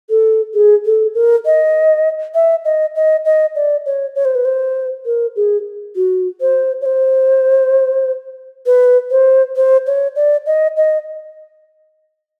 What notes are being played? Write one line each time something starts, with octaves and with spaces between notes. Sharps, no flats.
A4
G#4
A4
A#4
D#5
E5
D#5
D#5
D#5
D5
C#5
C#5
C5
B4
C5
A#4
G#4
F#4
C5
C#5
C5
B4
C5
C5
C#5
D5
D#5
D#5